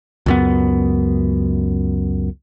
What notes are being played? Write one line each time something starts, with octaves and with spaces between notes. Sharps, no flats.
C#2 F#2 B3